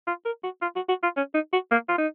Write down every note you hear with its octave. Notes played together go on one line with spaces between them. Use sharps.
F4
A#4
F#4
F4
F#4
F#4
F4
C#4
D#4
F#4
A#3
F4
D#4